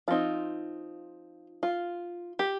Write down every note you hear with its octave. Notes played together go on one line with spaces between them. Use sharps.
F3 C4 D#4 F4
F4
G4